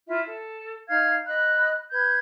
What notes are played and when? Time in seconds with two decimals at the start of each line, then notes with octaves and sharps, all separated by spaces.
0.08 E4 F4 E5
0.27 A4
0.89 D#4 F5 F6 G#6
1.27 D#5 B5 F#6
1.91 B4 G6 G#6